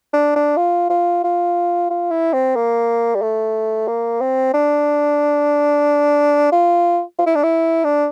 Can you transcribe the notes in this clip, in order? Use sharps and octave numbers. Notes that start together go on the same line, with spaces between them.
D4
D4
F4
F4
F4
F4
E4
C4
A#3
G3
A3
A#3
C4
D4
F4
F4
E4
D4
E4
D4